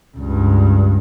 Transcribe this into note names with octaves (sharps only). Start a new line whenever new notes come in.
C#2 G2